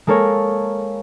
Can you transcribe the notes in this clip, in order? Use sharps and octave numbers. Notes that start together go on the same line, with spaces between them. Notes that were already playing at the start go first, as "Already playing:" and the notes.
G#3 A#3 A4 A#4 C#5